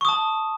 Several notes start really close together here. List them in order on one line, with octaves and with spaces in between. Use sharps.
C#6 D#6 A5